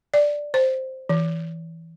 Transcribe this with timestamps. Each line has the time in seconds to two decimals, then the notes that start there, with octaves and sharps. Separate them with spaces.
0.14 D5
0.54 C5
1.09 E3